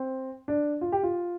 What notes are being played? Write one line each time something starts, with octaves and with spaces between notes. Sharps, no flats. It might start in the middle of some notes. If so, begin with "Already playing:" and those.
Already playing: C4
D4
F4
G4
F4